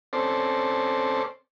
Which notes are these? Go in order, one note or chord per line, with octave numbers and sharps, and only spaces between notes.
C4 C#4 A4 C5 D5